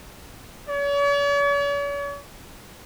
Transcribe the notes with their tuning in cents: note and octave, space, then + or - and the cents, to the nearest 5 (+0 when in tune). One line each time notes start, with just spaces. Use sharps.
C#5 +45